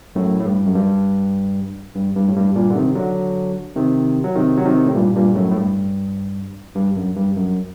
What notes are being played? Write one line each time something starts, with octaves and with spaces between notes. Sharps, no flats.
F#2 A2
A2
G2
F#2
G2
G2
G2
A2
G2
G2 A#2
D3
C3 D#3
D3 F#3
C3 D#3
F#3
C3 D#3
F#3
C3 D#3
A2
G2 A#2
G2 A#2
F#2 A2
A2
G2
G2
F#2
G2
F#2